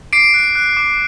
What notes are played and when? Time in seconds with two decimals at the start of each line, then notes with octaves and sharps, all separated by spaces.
0.13 D6 C7 D7
0.34 F#6
0.55 F#6
0.77 D6